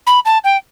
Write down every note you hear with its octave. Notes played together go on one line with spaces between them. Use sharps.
B5
A5
G5